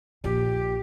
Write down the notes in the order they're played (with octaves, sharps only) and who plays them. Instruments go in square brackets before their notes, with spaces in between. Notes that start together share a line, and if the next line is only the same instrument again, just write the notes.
[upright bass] A#1 [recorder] G4